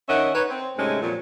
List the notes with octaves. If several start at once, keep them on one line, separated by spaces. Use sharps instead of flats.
D#3 C#4 D#5 E5 F#5
D#4 B4 C#5
C4
G#2 C3 G#3 A3 C#4
F2 A#2 F#3